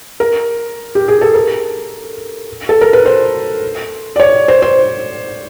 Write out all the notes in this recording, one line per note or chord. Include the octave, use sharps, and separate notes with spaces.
A#4
G4
G#4
A4
A#4
A4
A#4
B4
C5
D5
C#5
C5
C5